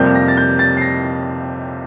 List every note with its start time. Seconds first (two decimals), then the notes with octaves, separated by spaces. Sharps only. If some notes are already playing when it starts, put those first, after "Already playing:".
Already playing: F2 C3 G3 A#3 G6
0.15 A#6
0.28 A6
0.37 G6
0.59 A6
0.77 C7
0.81 A#6